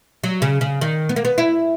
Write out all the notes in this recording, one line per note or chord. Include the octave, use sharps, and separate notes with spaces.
F#3
C#3
C#3
D#3
B3
A#3
B3
E4